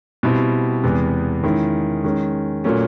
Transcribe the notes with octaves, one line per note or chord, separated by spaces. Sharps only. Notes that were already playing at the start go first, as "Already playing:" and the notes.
B2 G3 C4 E4
E2 C3 E3 G#3 B3
D#3 G#3 C#4 E4
D#3 G#3 C#4
A#2 F#3 A3 C#4